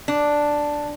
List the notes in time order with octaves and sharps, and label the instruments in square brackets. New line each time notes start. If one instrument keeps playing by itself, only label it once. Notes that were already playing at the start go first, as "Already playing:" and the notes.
[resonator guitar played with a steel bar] D4